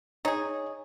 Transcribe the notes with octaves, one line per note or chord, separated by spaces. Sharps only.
D#4 G#4 C#5